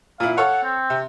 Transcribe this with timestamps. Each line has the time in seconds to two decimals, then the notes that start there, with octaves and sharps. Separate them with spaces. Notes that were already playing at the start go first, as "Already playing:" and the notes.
0.20 A#2 E4 F5
0.37 A4 C#5 F5 F#5
0.64 C4
0.90 C3